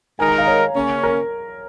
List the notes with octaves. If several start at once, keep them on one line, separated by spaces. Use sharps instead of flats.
D#3 G#3 D#4 A#4 G#5
A#5
F5
C#5
C#3 A#3 C#4
A#4